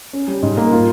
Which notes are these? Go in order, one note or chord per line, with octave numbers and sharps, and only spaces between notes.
C#4
G3
G#2
A#3
F4